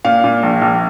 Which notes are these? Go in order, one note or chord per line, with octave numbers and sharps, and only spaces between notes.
A#2 F5
A#2
A#1
A#1